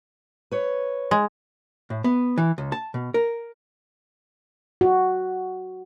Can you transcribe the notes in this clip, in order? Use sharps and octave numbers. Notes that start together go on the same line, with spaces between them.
B4 C#5
G#3
A2
B3
E3
C#2
A5
B2
A#4
F#4